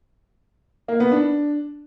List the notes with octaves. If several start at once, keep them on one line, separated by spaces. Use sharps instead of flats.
A#3
B3
D4